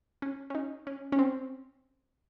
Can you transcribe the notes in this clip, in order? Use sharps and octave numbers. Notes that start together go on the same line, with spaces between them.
C#4
C#4
D#4
C#4
C#4
C4